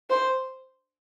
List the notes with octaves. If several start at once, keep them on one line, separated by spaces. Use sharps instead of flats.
C5